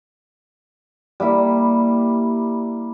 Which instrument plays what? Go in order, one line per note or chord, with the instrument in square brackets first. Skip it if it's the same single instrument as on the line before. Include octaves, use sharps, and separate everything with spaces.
[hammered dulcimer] G3 A#3 E4